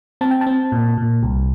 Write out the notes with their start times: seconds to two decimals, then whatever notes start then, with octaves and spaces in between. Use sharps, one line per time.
0.21 C4 A5
0.31 G5
0.41 A5
0.47 C4
0.72 A#2
0.98 A#2
1.23 C2